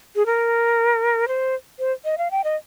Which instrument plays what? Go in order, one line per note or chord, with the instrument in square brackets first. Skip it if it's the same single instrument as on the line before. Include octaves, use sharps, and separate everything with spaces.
[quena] G#4
A#4
C5
C5
D#5
F5
G5
D#5